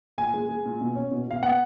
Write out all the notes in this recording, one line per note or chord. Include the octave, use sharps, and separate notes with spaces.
A#2 G#5
G#3
G#3
A#2
B2
C#4
B2
B2 F5
B3 F#5